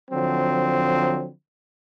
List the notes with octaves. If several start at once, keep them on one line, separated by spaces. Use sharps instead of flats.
D3 F3 F#3 C4